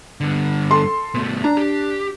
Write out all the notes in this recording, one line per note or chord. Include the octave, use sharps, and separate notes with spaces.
G2 D3
A4 C6
B2 A3
D4 A#5
G4